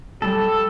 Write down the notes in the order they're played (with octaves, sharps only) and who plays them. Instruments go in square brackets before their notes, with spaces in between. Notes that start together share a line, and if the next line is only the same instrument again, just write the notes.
[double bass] G3 [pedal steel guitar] A4